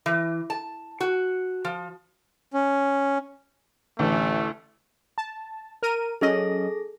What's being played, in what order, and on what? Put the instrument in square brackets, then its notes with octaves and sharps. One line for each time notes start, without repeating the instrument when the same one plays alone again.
[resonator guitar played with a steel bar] E3
A5
F#4
F3
[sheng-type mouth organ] C#4
[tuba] A1 [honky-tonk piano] D2 E3 [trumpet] A3
[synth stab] A5
A#4 D#7
[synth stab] F#3 C#4 D#5 [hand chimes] G#4 A4 A#6